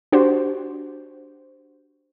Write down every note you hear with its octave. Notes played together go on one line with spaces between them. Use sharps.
D4 F#4 G4 C5